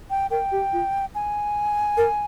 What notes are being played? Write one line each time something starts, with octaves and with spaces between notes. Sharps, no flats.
G5
A#4 G5
G4
F4
G#5
A#4